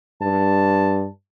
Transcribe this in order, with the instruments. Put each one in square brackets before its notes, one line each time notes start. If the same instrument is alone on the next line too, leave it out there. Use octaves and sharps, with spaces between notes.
[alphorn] G2 [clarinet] A5